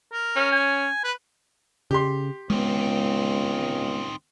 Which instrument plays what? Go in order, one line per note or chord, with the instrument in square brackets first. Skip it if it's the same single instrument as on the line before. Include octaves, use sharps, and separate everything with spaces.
[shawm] A#4
[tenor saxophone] C#4
[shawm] G#5
B4
[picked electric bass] C#3 [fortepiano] G4 C6
[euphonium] C#2 [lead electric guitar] D#3 C4 [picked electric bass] G#3 B3